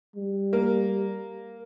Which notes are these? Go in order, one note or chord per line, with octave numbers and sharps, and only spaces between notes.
G3
A#3